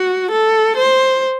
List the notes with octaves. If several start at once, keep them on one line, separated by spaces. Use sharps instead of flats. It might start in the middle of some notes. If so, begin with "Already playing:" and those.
Already playing: F#4
A4
C5